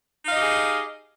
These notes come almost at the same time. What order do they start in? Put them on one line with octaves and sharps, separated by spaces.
D#4 F5 D#5 G4 G#4